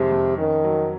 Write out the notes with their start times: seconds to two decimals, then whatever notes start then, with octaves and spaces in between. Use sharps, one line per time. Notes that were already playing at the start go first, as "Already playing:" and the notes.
Already playing: F2 C3 D#3 G#3
0.12 F2
0.38 D#3 C#4
0.64 F#3